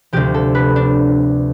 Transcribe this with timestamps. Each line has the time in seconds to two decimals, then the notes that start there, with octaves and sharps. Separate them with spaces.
0.13 D2 C3 F3 G4
0.34 A4
0.55 B4
0.76 D4